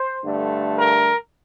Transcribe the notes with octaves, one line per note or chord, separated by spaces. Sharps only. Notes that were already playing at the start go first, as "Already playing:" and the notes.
Already playing: C5
G2 D3 A3
A#4